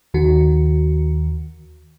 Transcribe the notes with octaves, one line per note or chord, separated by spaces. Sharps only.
D#2 D#3 F#4